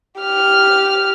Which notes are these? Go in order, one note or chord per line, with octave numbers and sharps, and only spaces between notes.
G4 F6